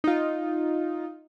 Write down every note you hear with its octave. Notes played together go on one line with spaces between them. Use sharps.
D#4 F4